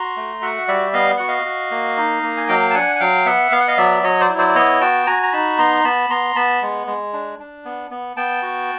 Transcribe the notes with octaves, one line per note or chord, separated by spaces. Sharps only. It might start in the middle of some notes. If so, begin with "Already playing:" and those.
Already playing: F#4 A#5 C6
A3
F#4 E5 F#5
G3 D5 E5
B3 D#5 F5
F#4 F#5
D#5 F5
F#4
A#3
D#4
A#3
G#5
F#3 F5 G5
A5
D4 F#5 G#5
G#5
F#3 F5 G5
B3 E5 F#5
B3 F5
F#5
D#5 F5
F#3 D5 E5
F#3 C#5 D#5
C5 D5
E4
C5 D5
D5
B3 C#5 D#5
F#4 G5 A5
F#4 G#5 A#5
A#5
D#4 A5 B5
B3 A#5 C6
B3 A5 B5
B3 A#5 C6
B3 A5 B5
G#3
G#3
D4
D4
B3
B3
B3 G5 A5
F#4